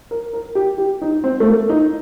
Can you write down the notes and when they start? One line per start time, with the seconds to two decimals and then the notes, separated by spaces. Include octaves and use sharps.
0.11 A#4
0.33 A#4
0.55 G4
0.78 G4
1.02 D#4
1.24 C4
1.40 A3
1.46 A#3
1.69 D#4